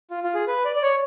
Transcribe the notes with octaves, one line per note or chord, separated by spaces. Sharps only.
F4
F4
G#4
B4
D5
D5
C#5